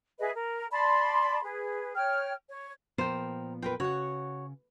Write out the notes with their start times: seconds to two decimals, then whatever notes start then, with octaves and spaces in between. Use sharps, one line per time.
0.19 G#4 B4 D#5 E5
0.34 A#4
0.71 D5 A5 B5 C6
1.43 G#4 B4
1.95 C#5 G5 F6
2.50 C#5
2.98 A#2 F3 B3 A#4 C5 G5
3.62 F4 A#4 B4 G5
3.80 C#3 F#4 C#5 F#5